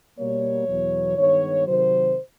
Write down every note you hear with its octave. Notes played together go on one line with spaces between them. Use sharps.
B2 G3 A#3 C#5
E2 B2 F#3
G2 D#3 G#3 B3 C#5
C3 D#3 F#3 C5